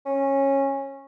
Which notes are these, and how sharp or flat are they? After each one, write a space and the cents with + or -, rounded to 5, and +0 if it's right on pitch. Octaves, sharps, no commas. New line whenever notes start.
C#4 -15